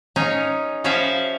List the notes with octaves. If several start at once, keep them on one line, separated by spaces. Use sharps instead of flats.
C#4 D#4 G#4 C#5
F3 C#4 E4 F#4 E5 F5